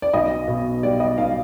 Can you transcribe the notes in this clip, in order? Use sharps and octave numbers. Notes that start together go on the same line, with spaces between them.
D5
B1 D#5
B2
G3 D5
D#5
B1 F5